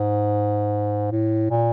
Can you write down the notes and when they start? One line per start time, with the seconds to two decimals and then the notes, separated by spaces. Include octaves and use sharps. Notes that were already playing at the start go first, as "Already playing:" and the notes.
Already playing: G#2
1.11 A2
1.50 A#2